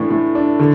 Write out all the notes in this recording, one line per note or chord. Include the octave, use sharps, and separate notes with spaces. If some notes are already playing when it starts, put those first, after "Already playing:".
Already playing: A2 E3 A3 D4
A2
D4
D3